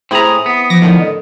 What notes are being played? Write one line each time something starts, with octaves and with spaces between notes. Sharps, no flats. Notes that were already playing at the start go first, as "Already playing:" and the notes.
A2 C4 E4 G#4 A#5 D#6
B3
F3 D6 A#6
A2 D3 D#3
D#5